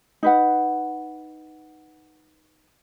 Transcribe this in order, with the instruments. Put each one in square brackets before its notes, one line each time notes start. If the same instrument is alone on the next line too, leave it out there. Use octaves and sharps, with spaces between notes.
[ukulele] D#4 B4 F#5